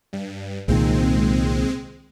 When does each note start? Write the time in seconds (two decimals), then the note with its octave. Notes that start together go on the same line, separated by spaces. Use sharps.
0.13 G2
0.68 C2 A#2 D#3 G#3 C4